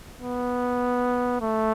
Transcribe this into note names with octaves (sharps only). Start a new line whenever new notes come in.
B3
A3